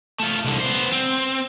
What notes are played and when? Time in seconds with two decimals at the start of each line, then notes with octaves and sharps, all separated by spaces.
0.20 A3 F4
0.44 C2 D3
0.60 B3 C5
0.92 C4